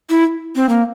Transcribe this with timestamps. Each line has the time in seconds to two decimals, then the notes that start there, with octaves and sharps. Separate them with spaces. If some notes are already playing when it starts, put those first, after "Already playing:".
0.10 E4
0.56 C4
0.69 A#3